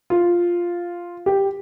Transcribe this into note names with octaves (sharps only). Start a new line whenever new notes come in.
F4
G4